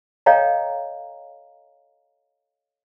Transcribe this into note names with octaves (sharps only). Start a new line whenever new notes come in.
A4 C#5 D#5 F5 G5 A#5